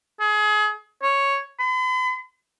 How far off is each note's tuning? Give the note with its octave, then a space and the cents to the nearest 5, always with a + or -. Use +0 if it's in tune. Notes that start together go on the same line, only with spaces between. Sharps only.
G#4 +30
C#5 +0
B5 +45